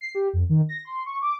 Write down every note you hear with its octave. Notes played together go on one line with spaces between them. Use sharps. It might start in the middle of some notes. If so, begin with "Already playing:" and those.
C7
G4
F2
D#3
A#6
C6
C#6
D6